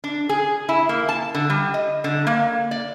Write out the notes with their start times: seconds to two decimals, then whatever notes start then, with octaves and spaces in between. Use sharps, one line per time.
0.04 D4
0.29 G#4
0.69 E4
0.89 A#3
1.09 A5
1.34 D3
1.50 G3
1.74 D#5
2.04 D3
2.27 A#3
2.71 D5